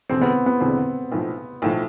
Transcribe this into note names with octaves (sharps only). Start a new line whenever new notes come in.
E1 E2 D3 C4
B3
B3
E1 E2 D3 C4
B1 A2 F3
B1 A2 F3